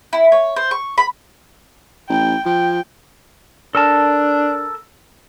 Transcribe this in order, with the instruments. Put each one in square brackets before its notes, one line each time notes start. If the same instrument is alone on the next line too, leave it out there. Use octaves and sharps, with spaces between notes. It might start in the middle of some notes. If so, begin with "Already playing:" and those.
[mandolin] E4
C#5
C5
C#6
B5
[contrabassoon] A1 [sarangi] G5
[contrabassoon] F3 [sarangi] G5
[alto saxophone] D4 [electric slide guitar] A4 A#4 A5